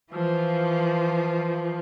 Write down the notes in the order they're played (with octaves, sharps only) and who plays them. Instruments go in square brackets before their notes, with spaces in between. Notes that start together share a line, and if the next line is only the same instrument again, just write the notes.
[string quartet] E3 F3 F4